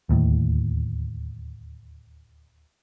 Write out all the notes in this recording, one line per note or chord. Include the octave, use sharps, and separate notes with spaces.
D1 D#2 A2